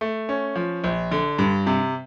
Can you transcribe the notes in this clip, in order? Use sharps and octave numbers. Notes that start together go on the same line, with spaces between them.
A3
C#4
F3
A#1
D3
G2
C3